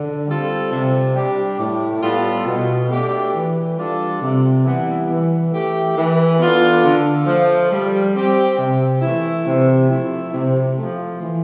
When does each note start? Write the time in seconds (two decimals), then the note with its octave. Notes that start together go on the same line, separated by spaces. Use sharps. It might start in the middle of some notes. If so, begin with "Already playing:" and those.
Already playing: D3
0.27 G3 C4 F4 A4
0.72 C3
1.15 G3 D4 G4
1.58 A2
2.02 G3 B3 F4 A4
2.46 B2
2.90 A3 D4 G4
3.34 E3
3.77 G3 D4 F4 A4
4.21 C3
4.65 E3 G3 B3 E4
5.09 E3
5.52 A3 E4 G4
5.96 E3
6.39 B3 D4 F4 A4
6.84 D3
7.27 F3 A3
7.71 G3
8.15 C4 G4
8.59 C3
9.02 E3 A3 E4
9.45 C3
9.89 F3 A3 E4
10.33 C3
10.77 F3 A3
11.20 E3